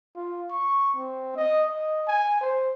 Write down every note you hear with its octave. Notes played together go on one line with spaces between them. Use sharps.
F4
C#6
C4
D#5
D#5
G#5
C5